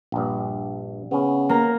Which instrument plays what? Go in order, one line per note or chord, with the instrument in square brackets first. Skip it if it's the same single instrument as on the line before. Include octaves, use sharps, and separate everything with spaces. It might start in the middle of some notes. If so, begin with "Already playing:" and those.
[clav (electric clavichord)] A#1 G2
[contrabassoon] C#3 [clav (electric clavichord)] B3 C#4
[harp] A#3 A#5